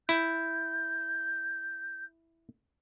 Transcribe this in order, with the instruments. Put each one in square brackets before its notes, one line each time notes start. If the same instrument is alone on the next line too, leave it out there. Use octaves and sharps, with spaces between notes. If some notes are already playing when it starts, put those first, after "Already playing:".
[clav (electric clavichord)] E4 [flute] G6